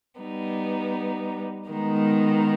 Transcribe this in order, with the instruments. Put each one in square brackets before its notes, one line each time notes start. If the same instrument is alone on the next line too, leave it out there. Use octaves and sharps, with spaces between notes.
[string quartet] G3 B3 D#4
D#3 G#3 B3 D#4 A#4